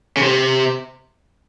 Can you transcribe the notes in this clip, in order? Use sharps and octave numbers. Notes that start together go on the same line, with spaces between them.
C#3
C3